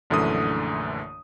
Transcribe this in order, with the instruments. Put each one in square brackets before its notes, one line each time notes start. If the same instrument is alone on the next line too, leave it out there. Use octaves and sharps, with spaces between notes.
[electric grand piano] A#1 F#2 D3 E3 A3 D#6